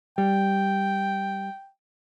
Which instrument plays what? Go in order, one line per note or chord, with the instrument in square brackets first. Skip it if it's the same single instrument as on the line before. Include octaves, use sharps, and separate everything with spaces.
[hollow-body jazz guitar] G3 [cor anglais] G5